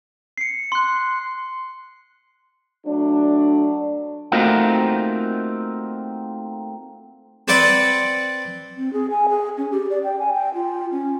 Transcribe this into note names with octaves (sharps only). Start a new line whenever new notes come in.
C7 C#7
C6 F#6
F#3 A3 D4
A3 A#3 C4 D#4 F4 F#4
C4 B4 D5 F#5
C4
G#4
G#5
G#4
C#4
G4
D5
G5
G#5
G5
F4
C#4